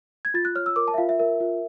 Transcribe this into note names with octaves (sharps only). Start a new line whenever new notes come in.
G#6
F4 A6
F#6
C#5 F6
E6
A#4 D6
A5
E5
F4 F5
E5
A#4 E5
F4